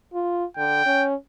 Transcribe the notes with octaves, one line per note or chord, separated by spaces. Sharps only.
F4
D3 G5
C#4